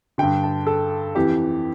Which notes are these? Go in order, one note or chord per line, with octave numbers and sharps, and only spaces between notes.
G2 D3 G5
A5
A4
F2 E3 G4